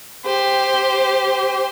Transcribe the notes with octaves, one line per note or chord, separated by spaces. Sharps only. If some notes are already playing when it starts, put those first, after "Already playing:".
G4 C5